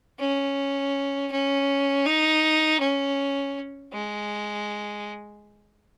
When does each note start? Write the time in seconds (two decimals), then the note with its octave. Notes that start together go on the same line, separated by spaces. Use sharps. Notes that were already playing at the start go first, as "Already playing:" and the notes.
0.19 C#4
1.31 C#4
2.06 D#4
2.80 C#4
3.92 G#3